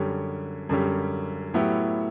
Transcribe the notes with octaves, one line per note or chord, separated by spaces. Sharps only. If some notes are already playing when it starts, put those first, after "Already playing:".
Already playing: F#2 D3 G3 C#4 G4
F#2 D3 G3 C#4 G4
A2 F#3 B3 E4 G4